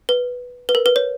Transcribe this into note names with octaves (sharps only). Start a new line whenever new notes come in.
B4
B4
A#4
B4
C#5